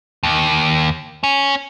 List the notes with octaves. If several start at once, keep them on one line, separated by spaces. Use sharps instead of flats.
D#2
C#4